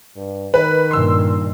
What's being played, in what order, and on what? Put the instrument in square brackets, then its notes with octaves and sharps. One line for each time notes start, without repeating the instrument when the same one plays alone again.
[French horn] G2
[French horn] D#3 [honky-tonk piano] B4
[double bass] G2 A#2 [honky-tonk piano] C6 E6